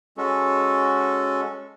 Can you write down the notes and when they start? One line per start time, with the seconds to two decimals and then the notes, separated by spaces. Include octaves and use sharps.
0.18 G#3 C#4 F#4 A4